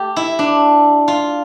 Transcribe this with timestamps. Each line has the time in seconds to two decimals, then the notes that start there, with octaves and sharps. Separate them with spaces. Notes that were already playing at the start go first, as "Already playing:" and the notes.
Already playing: A3 G4 A4
0.16 E4
0.39 D4
1.08 F4